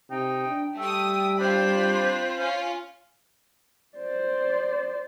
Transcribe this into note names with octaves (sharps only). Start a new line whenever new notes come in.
C3 D#4 G5
D4
G3 A3 E5 G5 D#6
C4 D4 F4 C5 B5
C#4 F4 F5
C5 D5